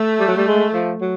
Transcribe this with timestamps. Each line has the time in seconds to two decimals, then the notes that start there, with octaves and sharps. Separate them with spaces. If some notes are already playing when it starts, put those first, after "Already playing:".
Already playing: A3
0.20 G3
0.28 F#3
0.37 G3
0.47 G#3
0.73 F3
1.01 F#3